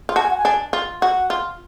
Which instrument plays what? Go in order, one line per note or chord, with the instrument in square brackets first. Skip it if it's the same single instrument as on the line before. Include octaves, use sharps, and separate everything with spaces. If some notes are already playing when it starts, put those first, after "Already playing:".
[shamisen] F4
[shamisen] F#4 [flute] A5
[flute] G#5
F#5
G#5
[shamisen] D4
F4
[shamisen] F#4 [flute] F#5
[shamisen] F4